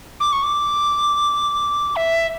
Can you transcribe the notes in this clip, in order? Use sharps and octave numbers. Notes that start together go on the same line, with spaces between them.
D6
C#6
D6
E5